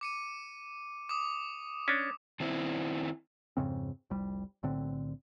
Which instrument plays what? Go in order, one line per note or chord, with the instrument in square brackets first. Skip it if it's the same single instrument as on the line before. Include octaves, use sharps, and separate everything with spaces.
[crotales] D6 C#7 D#7
D6 D#6
[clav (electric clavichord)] C#4 D4
[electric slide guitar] D#3 C4 E4
[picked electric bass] F2 G#2 C#3 C4
F1 C2 G3
B1 A2 D3 C4